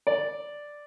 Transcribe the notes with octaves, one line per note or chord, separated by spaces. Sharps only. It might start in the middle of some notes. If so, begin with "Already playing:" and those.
D5